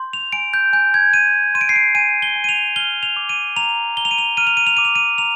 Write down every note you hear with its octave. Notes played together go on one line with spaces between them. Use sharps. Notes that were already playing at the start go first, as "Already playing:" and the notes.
Already playing: C6 G6
F7
G#5 D7
G6
G#5 G6
G#6
G6 D#7
C6 D#7
D7
C7
D7
G#5 D#7
G7
G#5
D#7
F7
F6 G7
F7
D6
D#7
A#5 F7
A#5 G7
F7
D#7
F7
F6 D#7
F7
D#7
F7
D6 D#7
F7
D#7
A#5 F7